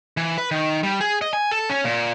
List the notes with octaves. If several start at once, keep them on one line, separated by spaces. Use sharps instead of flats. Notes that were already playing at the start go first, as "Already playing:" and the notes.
E3
B4
D#3
G3
G#4
D#5
G#5
A4
C#4
A#2